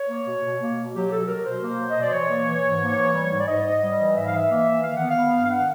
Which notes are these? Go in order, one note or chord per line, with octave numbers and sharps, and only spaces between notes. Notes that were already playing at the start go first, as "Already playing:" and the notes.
Already playing: C#5
A#3
B2
B2
A#3
B2
F#3 G4
B2 A4
F#3 A#4
B2 C5
A#3
F#3
D#5
B2
D5
E3 C#5
A#3
E3
G#2
A#3
E3
G3
G#2
D5
G#2 D#5
G#2
G3
E3
G#2 E5
F5
E3 E5
A#3
E3
D#3 F5
B3 F#5
F5
B3
G2
F5
D#3 F#5